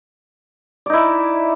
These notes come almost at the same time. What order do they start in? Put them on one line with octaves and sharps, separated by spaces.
D5 D#4 E4